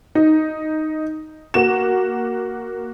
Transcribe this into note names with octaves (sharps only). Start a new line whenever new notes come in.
D#4
A#3 F#4 E7